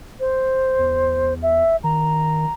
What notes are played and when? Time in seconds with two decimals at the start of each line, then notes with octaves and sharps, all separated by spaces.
0.20 C5
0.79 E2
1.42 E5
1.84 D#3 A#5